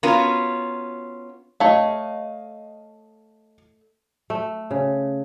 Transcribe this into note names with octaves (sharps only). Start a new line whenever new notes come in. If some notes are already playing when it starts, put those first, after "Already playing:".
B3 C#4 F4 F#4 A#4
A3 C#5 D#5 F5
A3
C#3